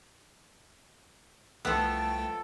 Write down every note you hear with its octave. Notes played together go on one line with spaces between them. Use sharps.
C2 F3 A3 B3 A4 G5